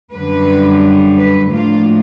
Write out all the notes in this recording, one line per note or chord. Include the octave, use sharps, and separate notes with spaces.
F#2 D3 G3 B4
B4
A2 F3 A#3 D4 F4